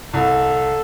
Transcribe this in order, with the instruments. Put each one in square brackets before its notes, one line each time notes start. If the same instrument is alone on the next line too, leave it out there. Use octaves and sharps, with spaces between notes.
[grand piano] C2 [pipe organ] A4